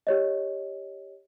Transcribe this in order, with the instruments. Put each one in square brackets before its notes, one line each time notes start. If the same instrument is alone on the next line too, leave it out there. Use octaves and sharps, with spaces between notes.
[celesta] G4 C#5 D#5